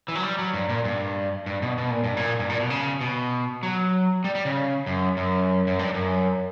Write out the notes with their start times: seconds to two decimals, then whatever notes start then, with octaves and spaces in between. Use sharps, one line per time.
0.08 E3
0.15 F#3
0.23 G3
0.38 F#3
0.54 G2
0.69 A#2
0.85 G2
1.46 G2
1.62 B2
1.78 B2
1.91 A#2
2.04 G2
2.17 A#2
2.39 G2
2.49 A#2
2.60 B2
2.70 C#3
3.01 B2
3.63 F#3
4.24 G3
4.35 G3
4.45 C#3
4.86 F#2
5.17 F#2
5.67 F#2
5.79 G2
5.94 F#2